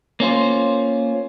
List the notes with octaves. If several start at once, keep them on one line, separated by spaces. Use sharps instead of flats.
A#3 C#4 F4 C5